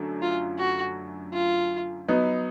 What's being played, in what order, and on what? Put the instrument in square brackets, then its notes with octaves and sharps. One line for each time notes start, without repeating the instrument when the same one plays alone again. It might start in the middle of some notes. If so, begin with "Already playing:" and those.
Already playing: [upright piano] F#2 D3 F#3 A3
[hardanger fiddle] F4
F#4
F4
[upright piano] F#3 B3 D#4